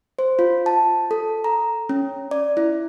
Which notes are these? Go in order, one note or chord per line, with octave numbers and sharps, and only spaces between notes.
C5
F4
A5
A4
A#5
C#4
D5
E4